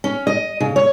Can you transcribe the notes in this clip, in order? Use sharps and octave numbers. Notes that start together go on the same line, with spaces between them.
C#4
D#5
C#3
C#5